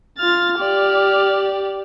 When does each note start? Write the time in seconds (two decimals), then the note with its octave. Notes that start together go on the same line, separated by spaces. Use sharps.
0.19 F4 F6 A6
0.58 G4 D5